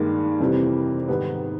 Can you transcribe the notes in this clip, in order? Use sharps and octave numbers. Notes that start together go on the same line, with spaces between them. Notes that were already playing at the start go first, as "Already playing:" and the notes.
Already playing: G2 D#3 G#3 A#3
F2 C3 E3 G3
G#2 D#3 G3 B3